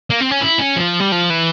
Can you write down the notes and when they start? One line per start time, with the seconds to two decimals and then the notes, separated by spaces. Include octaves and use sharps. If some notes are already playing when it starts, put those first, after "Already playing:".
0.10 A#3
0.21 C4
0.31 C#4
0.41 E4
0.59 C#4
0.76 F3
1.00 G3
1.12 F3
1.30 E3